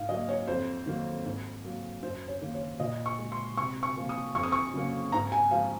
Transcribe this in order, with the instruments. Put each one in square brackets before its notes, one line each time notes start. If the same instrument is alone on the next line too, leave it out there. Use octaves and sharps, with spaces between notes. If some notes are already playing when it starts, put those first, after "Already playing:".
Already playing: [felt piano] G#2 F5
F#3 A#3 D#5
C#5
F2 C5
D#3 F#3 A#3
G#2
F#3 A#3
F#2 C5
C#5
D#3 A#3
C#5
A#2 D#5
C#6
G#3
C6
C3 C#6
C#6
F3 A#3
D#6
F2 C#6
D#6
C#6
C#3 F#3 A#3
G#2 A#5
G#5
F3 G#3 F5